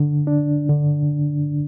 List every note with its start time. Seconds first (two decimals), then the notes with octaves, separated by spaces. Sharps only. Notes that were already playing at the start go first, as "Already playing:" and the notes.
Already playing: D3
0.27 D4
0.69 D3